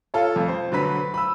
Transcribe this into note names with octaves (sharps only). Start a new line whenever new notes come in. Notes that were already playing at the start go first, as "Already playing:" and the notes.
F4 A4 C#5
F2
C5
D3 F#3 B4 B6
B5 E6